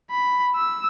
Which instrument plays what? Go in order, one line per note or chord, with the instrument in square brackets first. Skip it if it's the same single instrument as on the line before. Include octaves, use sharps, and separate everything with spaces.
[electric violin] B5
E6